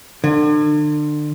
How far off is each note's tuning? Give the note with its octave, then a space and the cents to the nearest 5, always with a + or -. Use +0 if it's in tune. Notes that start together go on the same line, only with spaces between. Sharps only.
D3 +35